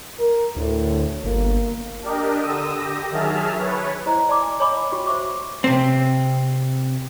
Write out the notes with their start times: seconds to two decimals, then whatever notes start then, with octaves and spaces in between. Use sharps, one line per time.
0.20 A#4
0.56 D2 A2
1.24 G1 A#3
2.03 D4 G4 A#4 D#5
2.39 D3 D#6 E6
2.75 G4 A#6
3.11 D#3 F#3 G#4 E5 A5 F6
3.58 B4 C#5
4.06 E4 C5 D#5 A#5
4.29 D5 A5 C6 D6
4.42 G#5
4.60 C#5 D#5 G#5 B5 D6
4.92 F4 F#4 G5 C#6
5.06 F#4 C5 E5 C#6 D6
5.64 C3 C4